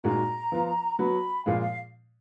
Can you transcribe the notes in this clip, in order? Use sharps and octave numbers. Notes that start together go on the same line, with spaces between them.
A#2 G#3 D#4 F#4 A#5
F3 B3 F4
F#3 B3 F#4 B5
A#2 F3 G#3 F5
F5